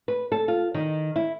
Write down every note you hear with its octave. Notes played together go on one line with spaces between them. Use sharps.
B4
A4
F4
D#3
E4